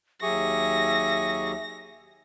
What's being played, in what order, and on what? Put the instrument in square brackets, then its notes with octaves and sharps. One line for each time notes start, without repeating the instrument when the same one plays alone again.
[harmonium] D#2 F#3 G4 [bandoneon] G#4 C#6 [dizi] E5 [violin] A#6